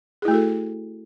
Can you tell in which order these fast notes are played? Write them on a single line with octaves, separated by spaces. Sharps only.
G#4 E4 A3 F#4 A4